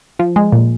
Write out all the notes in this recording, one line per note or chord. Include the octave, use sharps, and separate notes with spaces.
F3
G#3
A#2